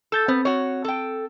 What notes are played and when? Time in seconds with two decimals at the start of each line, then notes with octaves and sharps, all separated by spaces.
0.12 A4 E6 G6 A6
0.28 B3 C4
0.45 F#4 C#5
0.85 A4 G5